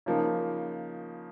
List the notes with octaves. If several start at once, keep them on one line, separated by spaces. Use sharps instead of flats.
C#3 F3 A#3 D#4